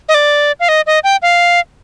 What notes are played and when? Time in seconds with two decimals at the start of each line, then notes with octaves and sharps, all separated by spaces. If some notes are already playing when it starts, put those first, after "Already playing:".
0.09 D#5
0.14 D5
0.60 F5
0.69 D#5
0.87 D#5
1.04 G5
1.22 F5